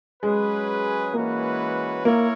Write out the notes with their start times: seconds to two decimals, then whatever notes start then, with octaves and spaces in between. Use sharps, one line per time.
0.22 F#3 G#3 C#4 G#4 B4
1.14 E3 G#3 A#3 C#4 F#4 B4
2.04 A#3 E4 A#4 C#5